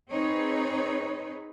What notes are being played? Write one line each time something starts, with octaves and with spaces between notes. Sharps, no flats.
C4 D#4 G#4 B4 C#5